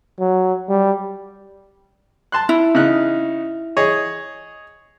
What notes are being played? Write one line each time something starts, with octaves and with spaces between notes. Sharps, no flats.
F#3
G3
A5 C6 F#6
E4
C#3 D#4 F#6
G#4 C#5 D#5